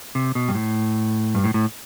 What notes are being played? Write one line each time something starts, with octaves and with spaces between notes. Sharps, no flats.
C3
B2
G2
A2
G2
A2
A2